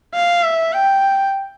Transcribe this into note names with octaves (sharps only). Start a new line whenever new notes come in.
F5
E5
G5